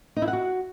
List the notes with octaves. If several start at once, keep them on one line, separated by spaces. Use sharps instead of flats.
D#4
E4
F#5
F#4